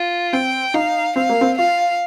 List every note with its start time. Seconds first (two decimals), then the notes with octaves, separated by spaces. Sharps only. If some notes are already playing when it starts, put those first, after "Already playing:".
Already playing: F4
0.33 C4 G5
0.74 D#4 F5
1.16 C4 F5
1.29 A#3
1.41 C4
1.58 F4 F5